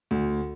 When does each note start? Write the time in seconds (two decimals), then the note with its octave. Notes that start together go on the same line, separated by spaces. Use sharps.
0.11 D2